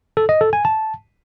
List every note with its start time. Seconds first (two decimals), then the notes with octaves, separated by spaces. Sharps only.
0.17 A4
0.29 D#5
0.41 A4
0.53 G#5
0.65 A5